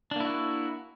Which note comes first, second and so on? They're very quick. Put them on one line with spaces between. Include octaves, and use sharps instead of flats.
D4 A#3 E4 F#4